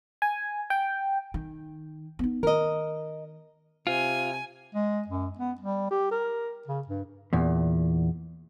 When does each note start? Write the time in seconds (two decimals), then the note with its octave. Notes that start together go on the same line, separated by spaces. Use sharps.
0.22 G#5
0.70 G5
1.34 D#3
2.19 B3 D#4
2.43 D#3 A#4 D#5
3.87 C3 F4 G#5
4.75 G#3
5.07 F#2
5.39 B3
5.60 G3
5.91 G4
6.11 A#4
6.67 C#3
6.87 G2
7.33 E2 A#2